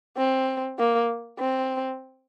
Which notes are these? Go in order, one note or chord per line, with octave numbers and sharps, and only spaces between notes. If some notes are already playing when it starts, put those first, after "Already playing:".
C4
A#3
C4